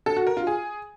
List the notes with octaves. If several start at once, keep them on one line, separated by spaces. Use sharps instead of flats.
A4
F#4
A#4
F4
G#4